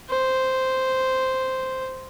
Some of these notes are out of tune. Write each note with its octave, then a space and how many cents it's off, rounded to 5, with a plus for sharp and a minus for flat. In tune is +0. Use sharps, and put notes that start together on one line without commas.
C5 -5